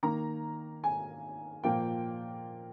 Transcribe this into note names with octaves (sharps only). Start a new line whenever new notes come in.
D#3 A#3 A#5
G#5
A#2 F3 A#3 G5